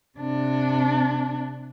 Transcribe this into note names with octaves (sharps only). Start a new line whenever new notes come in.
C3 D4